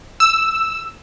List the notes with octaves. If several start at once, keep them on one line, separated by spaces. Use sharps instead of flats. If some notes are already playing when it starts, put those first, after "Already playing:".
E6